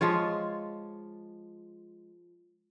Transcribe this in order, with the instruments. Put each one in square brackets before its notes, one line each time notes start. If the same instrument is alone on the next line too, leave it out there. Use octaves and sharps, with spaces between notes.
[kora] F3 G#3 F4 C#5